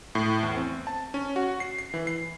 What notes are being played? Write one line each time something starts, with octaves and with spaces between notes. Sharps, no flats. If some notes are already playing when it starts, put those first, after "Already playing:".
A2
E2
C4
A5
C#4
F#4
C7
C7
E3
C7